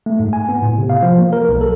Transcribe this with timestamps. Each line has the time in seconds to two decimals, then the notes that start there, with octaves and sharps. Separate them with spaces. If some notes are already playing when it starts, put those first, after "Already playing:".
0.06 A3
0.19 G#2
0.33 G#5
0.49 B3
0.62 A2
0.78 C3
0.90 F5
1.03 F3
1.18 A#3
1.33 A#4
1.49 B1
1.61 A4